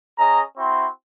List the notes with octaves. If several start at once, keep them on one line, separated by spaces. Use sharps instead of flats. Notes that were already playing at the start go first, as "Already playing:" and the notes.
C#4 G#4 D#5 A#5
C4 E4 F#4 C6